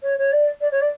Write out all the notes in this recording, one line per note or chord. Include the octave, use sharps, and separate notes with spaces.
C#5
C#5
D5
D5
C#5
D5